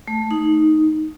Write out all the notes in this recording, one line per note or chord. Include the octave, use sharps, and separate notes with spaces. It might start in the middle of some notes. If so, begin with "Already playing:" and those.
A3
D#4